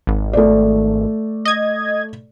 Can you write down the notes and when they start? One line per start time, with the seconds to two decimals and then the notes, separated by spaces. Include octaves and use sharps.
0.07 G#1
0.33 A3 D5
1.45 D#5 G#6